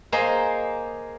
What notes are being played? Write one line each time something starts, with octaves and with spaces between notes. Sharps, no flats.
A#3 G#4 C5 D#5